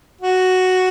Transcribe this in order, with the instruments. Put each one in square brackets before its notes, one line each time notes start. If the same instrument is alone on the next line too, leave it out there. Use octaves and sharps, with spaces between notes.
[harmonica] F#4